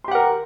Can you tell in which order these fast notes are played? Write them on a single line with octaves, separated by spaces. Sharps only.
C6 G4 F#5 A#4